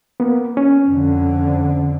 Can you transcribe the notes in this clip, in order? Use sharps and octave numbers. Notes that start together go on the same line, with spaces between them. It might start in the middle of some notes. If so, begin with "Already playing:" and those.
A#3 B3
C#4
F2 D3